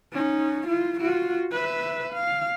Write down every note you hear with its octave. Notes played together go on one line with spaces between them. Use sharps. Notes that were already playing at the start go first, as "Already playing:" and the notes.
C#4 D#4
E4 F4
F4 F#4
B4 E5
F5